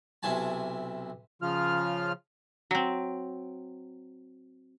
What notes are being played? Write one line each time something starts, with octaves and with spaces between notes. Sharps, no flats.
B1 C3 E4 G#5 A5
C#3 F3 F4 F6
F#3 C4